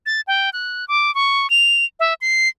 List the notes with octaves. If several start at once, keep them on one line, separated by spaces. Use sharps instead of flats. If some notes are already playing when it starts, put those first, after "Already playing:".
A6
G5
F#6
D6
C#6
F7
E5
C7